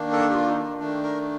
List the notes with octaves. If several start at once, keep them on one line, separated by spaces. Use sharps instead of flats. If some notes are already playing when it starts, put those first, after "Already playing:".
Already playing: D#3 A#3 D4
A4
G4
F4
D#4
D4
D#3 A3 D4
A#4